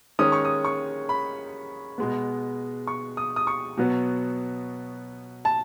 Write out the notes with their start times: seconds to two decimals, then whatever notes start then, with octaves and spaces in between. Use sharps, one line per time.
0.19 D#3 G#3 C#4 D#6
0.32 C#6
0.45 D#6
0.65 C#6
1.09 B5
1.98 B2 G#3 B3
2.87 C#6
3.17 D#6
3.36 D#6
3.47 C#6
3.77 B2 F#3 B3
5.45 A5